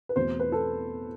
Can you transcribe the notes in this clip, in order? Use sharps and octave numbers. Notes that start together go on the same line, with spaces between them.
B4
E2 B2 A3 C4 C5
B4
A4